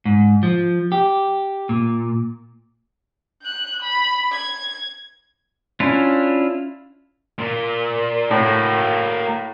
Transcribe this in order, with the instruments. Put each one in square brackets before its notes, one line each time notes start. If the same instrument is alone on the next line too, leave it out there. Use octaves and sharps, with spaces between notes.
[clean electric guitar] G#2
F3
G4
A#2
[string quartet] F#6 G6
B5
G#6
[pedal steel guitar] C#4 D4 E4 F4
[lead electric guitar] A#2
[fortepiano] A2 [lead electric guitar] A#3 F#4